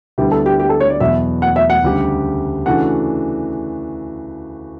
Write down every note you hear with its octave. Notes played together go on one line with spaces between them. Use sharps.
D2 D3 G3 B3 E4 G4
A4
G4
G4
A4
C#5
D5
E2 B2 F#3 E5
F#5
E5
F#5
D2 C#3 G3 D4 G4
C#3 E3 A3 D4 F#4 F#5